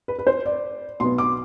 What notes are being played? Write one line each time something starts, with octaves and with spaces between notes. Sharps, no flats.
B4
B4
C5
D5
B1 B2 B3 C6
D6